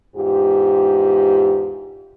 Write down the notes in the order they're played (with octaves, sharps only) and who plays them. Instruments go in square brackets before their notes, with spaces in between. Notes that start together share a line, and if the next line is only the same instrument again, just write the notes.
[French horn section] E2 G#2 F4 G4